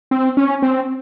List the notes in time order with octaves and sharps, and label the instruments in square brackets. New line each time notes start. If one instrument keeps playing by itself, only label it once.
[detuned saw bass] C4
C#4
C4